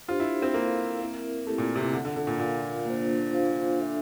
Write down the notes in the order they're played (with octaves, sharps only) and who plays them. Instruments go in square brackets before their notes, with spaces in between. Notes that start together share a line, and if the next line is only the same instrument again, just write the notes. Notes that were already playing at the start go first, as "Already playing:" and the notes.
[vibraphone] D4 G4 C5 [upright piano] F4
[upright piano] E4
C4
[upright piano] A#3 [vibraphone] E4 A4 C5 F5
[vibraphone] C4 E4 A#4 E5
[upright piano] A3 [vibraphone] C4 E4 G4
[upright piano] A#2
C3
A#2
[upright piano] D3 [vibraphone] D4 F4 A4
[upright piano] D3
D3
A#2
[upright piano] A#2 [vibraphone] F4 A#4 F5
[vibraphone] A#3 D4 F4 C5
D4 F4 C5 F5
D4 A4 E5